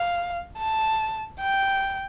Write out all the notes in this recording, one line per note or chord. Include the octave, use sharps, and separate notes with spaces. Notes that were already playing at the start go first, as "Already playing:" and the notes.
Already playing: F5
A5
G5